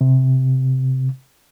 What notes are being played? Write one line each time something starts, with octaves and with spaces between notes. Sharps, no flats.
C3